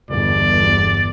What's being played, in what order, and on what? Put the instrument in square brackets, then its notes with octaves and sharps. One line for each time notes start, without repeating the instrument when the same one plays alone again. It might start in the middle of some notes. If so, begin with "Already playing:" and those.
[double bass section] G1 E2 [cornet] D5